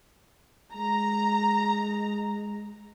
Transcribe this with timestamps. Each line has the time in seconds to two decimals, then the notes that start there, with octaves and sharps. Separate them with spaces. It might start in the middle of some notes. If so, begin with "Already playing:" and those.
0.75 G#3 A#5